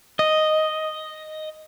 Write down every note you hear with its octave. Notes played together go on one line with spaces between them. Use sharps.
D#5